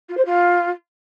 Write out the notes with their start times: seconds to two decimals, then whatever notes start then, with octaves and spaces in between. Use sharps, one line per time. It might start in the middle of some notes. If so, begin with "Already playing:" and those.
0.09 F4
0.17 C5
0.25 F4